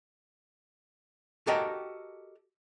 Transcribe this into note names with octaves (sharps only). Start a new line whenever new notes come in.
F#4 G4 A4 A#4 D#5 G5